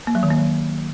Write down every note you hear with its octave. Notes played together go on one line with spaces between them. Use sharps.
A#3
F#3
D#3
A#3
F#3